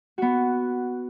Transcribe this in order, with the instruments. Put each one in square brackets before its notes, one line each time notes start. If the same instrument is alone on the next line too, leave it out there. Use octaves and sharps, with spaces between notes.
[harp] B3 F#4